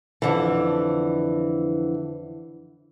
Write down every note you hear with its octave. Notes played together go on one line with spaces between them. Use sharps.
F2 D3 E3